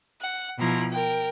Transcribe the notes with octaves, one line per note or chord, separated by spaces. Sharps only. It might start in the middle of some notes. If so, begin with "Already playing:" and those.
F#5
B2 F3 E4 A#5 C6
A#4 G5